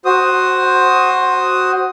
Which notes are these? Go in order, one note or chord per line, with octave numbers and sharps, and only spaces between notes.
F#4 C5 D#6